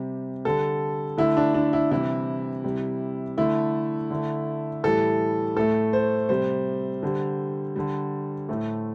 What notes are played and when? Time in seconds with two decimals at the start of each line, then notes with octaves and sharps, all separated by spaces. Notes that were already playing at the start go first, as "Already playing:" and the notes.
Already playing: C3 G3
0.45 D3 G3 A4
1.18 D3 A3 E4
1.37 D4
1.54 D4
1.73 E4
1.91 C3 E3 G3 E4
2.64 C3 G3
3.37 D3 A3 E4
4.10 D3 A3
4.83 A2 E3 G3 A4
5.56 A2 A3 A4
5.93 C5
6.29 C3 G3 C5
7.03 D3 G3
7.76 D3 G3
8.49 A2 A3